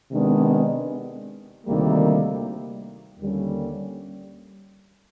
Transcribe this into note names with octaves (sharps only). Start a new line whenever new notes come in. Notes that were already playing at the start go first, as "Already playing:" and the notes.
C3 D#3 G#3 B3 D4
D2 C3 D#3 G3 A#3
D#2 D3 G3 A#3 C#4